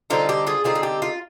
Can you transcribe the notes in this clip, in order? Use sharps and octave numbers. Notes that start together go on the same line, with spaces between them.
D3 G3 C4 D#4 F4
G4
F4 G#4
D3 G3 C4 D#4 F4 G#4
F4
G4
F4